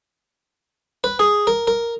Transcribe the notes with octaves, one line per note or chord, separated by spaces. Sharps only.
B4
G#4
A#4
A#4